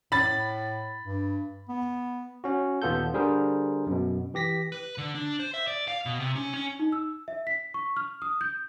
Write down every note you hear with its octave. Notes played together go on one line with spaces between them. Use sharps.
A2 B5 A6
G2
B3
C#4 F#4
D#2 A#2 B3 F4 A4 G6
D3 G3 G#4 A#4 C5
F#2 B2
E3 G4 A#6 B6
B4
D3
D4
C5
E5
D5
F5
B2
C3
C#4
C#4
D#4
E6
E5
B6
C#6
F6
D#6
G6